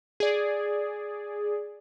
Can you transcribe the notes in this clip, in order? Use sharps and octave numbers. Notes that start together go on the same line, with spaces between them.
G#4 D5